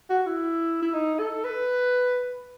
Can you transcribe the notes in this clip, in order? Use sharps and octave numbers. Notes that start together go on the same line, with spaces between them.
F#4
E4
E4
D#4
A4
B4